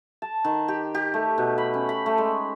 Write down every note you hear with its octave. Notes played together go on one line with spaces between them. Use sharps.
A5
D#3
G4
G4
A3
B2
B5
C#4
B5
A3
G#3